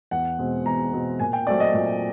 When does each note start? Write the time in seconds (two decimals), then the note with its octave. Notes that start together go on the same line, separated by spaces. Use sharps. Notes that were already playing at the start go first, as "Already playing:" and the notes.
0.11 E2 F#5
0.39 B2 G#3 C4
0.66 E2 A#5
0.92 B2 G#3 C4
1.20 A#2 G#5
1.33 G5
1.47 F#3 A3 C4 D5
1.60 D#5
1.74 A#2